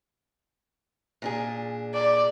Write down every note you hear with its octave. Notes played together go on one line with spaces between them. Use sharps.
A#2 D4 G#4
D5